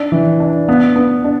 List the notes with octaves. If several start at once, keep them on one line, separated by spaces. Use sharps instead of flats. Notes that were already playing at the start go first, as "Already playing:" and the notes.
Already playing: D4
E3
D4
B3
B3
D4